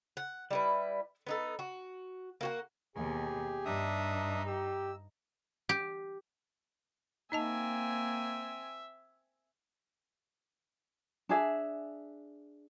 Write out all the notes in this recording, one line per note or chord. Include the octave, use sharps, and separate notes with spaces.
F#5
G3 E4 B4
B3 D#4 A4
F#4
A#3 F#4 F#5
D#2 B2 G4 G#4
G2 D4 D#4 E5 D#6
G4 E6
G4
A#3 C4 D#4 D#5 E5 G#5 A5
D4 G#4 E5